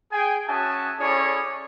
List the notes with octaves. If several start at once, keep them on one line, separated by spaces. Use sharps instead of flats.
G#4 G5 G#5
C#4 F#4 E5 G#5 A5 D#6
C#4 E4 G#4 A4 C#5 D5